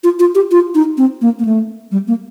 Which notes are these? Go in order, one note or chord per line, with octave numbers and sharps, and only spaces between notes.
F4
F4
G4
F4
D#4
C4
A#3
A#3
A3
G3
A#3